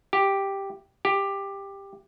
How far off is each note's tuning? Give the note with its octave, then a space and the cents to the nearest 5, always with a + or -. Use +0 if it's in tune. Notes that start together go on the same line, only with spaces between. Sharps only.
G4 +0
G4 +10